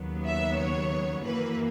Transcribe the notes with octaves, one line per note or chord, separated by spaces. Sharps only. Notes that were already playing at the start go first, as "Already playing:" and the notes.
Already playing: D#2 C#3 F#3 B3
E5
C#5
F#2 E3 A#3 B4